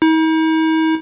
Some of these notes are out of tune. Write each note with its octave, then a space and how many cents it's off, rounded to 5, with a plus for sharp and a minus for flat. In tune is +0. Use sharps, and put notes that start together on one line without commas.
D#4 +45